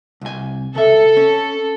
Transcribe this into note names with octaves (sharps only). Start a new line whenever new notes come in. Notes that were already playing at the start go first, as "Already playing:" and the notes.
C2 G#5
C#2 A4 E5
C#4